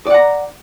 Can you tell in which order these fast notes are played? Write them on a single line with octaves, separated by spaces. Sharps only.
D5 F#5 A#5